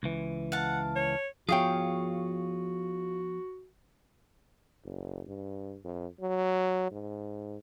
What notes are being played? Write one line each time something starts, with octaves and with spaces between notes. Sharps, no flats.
C#2 E3
F5 F#5 A5
C#5
F3 B3 F4 F#4 G#4 C#5 F5 G5
F#1
G2
F2
F#3
G#2